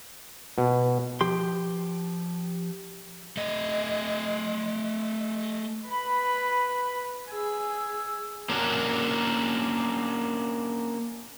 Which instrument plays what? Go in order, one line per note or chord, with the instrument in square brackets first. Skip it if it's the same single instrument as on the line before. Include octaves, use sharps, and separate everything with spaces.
[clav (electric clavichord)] B2
[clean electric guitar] F3 G4 C6
[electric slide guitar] A3 D#5
[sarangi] B4 [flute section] B5
[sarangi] G#4 [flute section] E6
[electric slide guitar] A#3 C#4 D4 F#4 A4 A#4